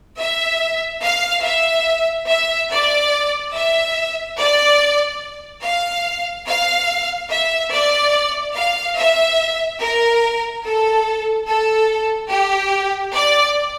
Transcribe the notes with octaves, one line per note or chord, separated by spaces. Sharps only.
E5
F5
E5
E5
D5
E5
D5
F5
F5
E5
D5
F5
E5
A#4
A4
A4
G4
D5